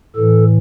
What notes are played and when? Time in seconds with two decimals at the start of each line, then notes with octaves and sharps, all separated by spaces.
0.16 A2 E3 A4